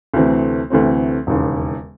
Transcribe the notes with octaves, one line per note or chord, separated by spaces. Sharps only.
D2 C3 E3 A3 C4
D2 C3 E3 A3 C4
E1 D#2 C#3